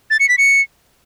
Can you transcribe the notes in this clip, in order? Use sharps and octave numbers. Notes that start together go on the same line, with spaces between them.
A6
C#7
B6
C#7